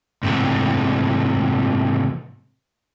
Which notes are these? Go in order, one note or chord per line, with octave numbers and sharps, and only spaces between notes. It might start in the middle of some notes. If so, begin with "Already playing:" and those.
G#2 C3 E3 A3